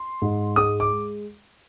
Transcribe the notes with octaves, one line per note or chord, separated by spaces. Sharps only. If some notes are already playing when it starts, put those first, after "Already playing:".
Already playing: C6
G#2
G#3 D#6
D6